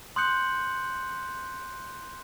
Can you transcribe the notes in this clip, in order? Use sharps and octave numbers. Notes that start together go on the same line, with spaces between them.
C6 D#6 F#6 G6 C#7 F#7